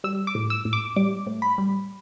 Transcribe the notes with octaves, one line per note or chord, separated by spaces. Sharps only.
G3 E6
D6
A2
E6
A2
D6
G3 D6
A2
B5
G3